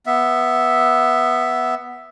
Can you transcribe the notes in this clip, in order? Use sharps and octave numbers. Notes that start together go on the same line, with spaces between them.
B3 E5